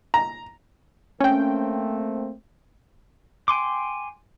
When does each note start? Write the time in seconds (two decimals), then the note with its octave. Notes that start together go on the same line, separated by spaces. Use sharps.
0.14 A#5
1.20 A3 A#3 C4 C#4 G5
3.48 G5 G#5 C6 D6